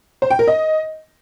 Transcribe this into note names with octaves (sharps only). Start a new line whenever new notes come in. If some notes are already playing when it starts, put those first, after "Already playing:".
C5
G5
A#4
D#5